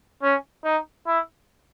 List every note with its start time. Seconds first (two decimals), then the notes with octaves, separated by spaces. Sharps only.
0.22 C#4
0.64 D#4
1.07 E4